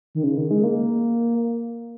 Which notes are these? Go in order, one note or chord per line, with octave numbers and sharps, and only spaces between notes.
D#3
C#3
D#3
G#3
A#3